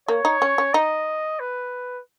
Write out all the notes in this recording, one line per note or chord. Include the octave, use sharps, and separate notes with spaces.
A#3 C#5
D#4
C#4
C#4
D#4 D#5
B4